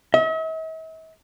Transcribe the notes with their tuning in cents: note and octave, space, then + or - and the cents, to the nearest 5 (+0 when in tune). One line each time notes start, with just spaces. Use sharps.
E5 -45